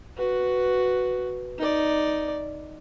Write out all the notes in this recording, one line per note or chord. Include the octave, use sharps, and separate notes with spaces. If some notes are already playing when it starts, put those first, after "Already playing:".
F#4 B4
D#4 D5